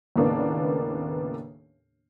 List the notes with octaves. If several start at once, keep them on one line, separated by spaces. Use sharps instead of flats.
D#2 A2 C#3 A#3 B3 D4